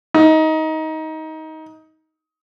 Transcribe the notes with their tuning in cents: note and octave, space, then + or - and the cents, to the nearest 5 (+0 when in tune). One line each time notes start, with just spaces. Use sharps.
D#4 +20